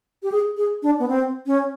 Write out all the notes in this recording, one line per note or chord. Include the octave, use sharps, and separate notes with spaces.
G4
G#4
G#4
D4
B3
C4
C#4